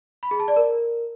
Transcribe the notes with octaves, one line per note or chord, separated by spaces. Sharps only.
B5
G#4
A5
D5
A#4